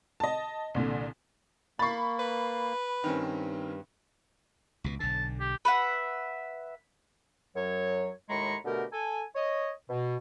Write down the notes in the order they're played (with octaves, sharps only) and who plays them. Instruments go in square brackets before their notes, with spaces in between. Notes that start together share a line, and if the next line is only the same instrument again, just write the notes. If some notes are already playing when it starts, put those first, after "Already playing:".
[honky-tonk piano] D#5 A5
C2 A#2 D3
[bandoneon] A#3 [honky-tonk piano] B5 C#6 [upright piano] A6 C7
[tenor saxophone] B4
[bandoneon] G2 [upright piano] D#3 C4 C#4
[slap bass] C#2 B2
[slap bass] B1 D3 [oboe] A5
[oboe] G4
[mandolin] B4 E5 F#5
[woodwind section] F#2 F#3 C#5
D#2 A2 G#3 A#5 B5 C#6
B2 D3 A3 G4 A#4
A4 G#5
C#5 D#5
B2